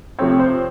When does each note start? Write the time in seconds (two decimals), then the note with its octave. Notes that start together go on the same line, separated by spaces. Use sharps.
0.19 C3 F3 A3 C4 C#5
0.40 C5